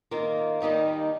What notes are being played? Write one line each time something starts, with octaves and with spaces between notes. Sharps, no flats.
D#3 A#3 F4
D#2 D#3 G3 D#4 G4